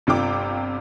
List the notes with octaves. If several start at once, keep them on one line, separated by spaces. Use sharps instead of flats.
G1 C3 F4 G5 D6